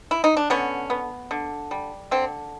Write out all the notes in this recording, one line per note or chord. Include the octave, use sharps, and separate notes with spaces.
E4
D#4
D4
D3 B3 C#4
B3
D3
G3
D3 C4